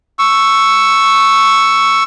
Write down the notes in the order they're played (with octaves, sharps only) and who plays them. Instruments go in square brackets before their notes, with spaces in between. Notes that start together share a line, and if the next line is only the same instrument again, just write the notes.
[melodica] C#6 E6